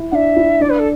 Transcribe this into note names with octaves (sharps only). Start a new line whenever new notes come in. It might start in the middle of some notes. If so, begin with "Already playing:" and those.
Already playing: E4
D4 F#5
E5
E4
D4 D5
B4
A4